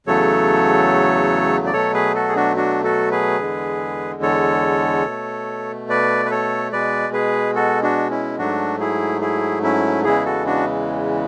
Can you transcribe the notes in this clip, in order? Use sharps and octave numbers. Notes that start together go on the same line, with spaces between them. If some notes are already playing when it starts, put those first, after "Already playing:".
E2 C#3 F#3 A3 A4 C#5
D5
B2 F#3 A3 A4 C#5
G#4 B4
F#4 A4
G#4
D4 F#4
D4 F#4
F#4 A4
G#4 B4
E2 D3 G#3
A4 C#5
B2 A3
B4 D5
B4
A4 C#5
B2 G#3 B4 D5
G#4 B4
F#4 A4
D4 F#4
C#4 E4
G#2 F#3 A3 D4 F#4
E4 G#4
E4 G#4
C#4 E4
E2 C#3 E3 G#3 E4 G#4
F#4 A4
D4 F#4